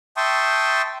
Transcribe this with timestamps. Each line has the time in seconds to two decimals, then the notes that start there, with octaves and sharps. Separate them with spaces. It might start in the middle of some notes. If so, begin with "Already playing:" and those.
0.17 E5 G5 A5 C6 C#6 D#6